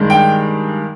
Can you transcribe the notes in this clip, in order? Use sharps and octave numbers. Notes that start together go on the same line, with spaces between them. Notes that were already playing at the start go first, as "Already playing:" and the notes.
Already playing: G2 D#3 G#3
G5